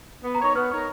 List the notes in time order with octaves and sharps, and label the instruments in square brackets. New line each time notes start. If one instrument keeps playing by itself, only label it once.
[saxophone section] B3
[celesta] A#5
[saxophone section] D#4 A#4 C#5 [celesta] C#6
[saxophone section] B3 [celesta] F6
[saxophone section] D#4 A#4 C#5